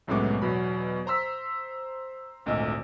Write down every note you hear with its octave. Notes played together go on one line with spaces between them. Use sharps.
C2 F#2 A2 G#3 B3 D6
E2 B2 F#3 B5
C5 A#5 C6 E6 B6
G#1 D2 A#2 D#5 E6